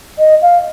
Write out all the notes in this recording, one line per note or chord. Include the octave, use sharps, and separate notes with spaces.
D#5
F5